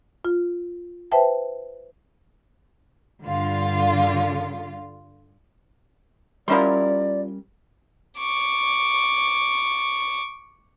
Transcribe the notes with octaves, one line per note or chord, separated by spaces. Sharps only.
F4
B4 C5 E5 G5 A5
G2 D3 F4
F3 G3 C#4 E4 A#4 D5 C6
C#6 D6